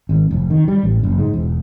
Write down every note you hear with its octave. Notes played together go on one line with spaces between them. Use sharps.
G#1
F1
D#3
G3
A1
F#1
G#2
E1